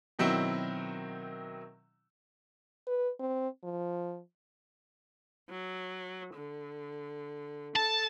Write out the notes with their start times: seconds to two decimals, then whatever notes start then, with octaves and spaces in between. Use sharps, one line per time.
0.19 B2 D#3 F#3 C4 E4
2.87 B4
3.19 C4
3.63 F3
5.50 F#3
6.35 D3
7.76 A4 A5